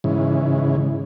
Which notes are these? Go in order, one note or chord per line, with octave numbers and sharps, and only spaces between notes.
G#2 C#3 E3